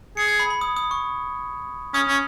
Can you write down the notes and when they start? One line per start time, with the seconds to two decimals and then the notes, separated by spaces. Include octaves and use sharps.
0.17 G#4 C#7
0.28 G#6
0.40 B5
0.50 B5
0.61 D#6
0.77 D#6
0.91 C#6
1.94 C#4 D#6
2.08 C#4